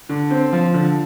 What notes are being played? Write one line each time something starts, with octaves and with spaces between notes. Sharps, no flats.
D3
C4
F3
D3